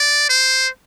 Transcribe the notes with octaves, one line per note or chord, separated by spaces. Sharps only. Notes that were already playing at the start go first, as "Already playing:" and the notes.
Already playing: D5
C5